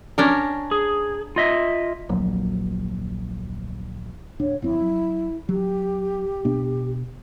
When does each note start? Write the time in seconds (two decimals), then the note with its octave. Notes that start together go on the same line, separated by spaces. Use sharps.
0.18 C#4 D4 A#4
0.71 G#4
1.36 F4 D#5 E5
2.09 D1 A#1 F2 F#3
4.39 D1 D4 C#5
4.62 G1 F2 C4 E4
4.81 F#3
5.49 F#3 G4
6.45 B2 B3 D4